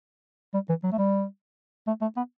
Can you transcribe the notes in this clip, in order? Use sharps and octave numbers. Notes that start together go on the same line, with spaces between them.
G3
E3
F#3
A3
G3
A3
A3
B3